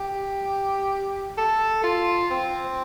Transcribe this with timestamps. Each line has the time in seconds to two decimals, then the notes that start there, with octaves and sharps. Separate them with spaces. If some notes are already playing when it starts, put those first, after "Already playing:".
Already playing: G4
1.37 A4
1.84 F4
2.31 C4